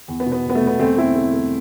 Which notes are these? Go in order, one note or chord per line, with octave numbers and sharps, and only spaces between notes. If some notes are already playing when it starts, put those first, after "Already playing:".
E2
B3
B2
B3
E2
B3
A3
B2
B3
E2 A3 C4
A3 C4 E4
A3
A3